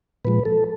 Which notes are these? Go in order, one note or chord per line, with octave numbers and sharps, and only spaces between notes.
A#2 F3 G#3 B4
A4